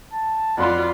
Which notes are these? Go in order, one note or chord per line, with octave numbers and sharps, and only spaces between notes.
A5
F2 F4 D5 F#5 B5 C6